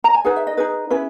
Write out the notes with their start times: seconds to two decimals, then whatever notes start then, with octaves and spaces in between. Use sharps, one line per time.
0.04 A#5
0.15 G#5
0.24 D#4 G#4 B4 F#5
0.36 E5
0.47 D#5
0.57 D#4 G#4 B4
0.90 C#4 E4 G#4 B4